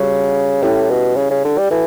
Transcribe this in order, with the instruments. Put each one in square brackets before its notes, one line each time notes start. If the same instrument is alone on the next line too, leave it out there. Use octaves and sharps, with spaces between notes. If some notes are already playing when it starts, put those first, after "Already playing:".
Already playing: [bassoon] C#3 [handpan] G3 C#4 F#4
[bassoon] A2 [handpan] C#4 E4 G4
[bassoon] B2
C#3
C#3
D3
G3
[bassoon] E3 [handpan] F#4 A4